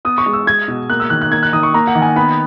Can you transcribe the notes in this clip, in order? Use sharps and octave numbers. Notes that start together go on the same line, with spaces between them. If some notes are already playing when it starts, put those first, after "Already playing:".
B3 D#6
C#6
G#3
E6
G#3 G#6
B2
A#3 F#6
E6
D#3 F#6
F#6
A#3 G#6
F#6
D#3 D#6
C#6
A#3 A#5
F#5
D#3
G#5
B3 B5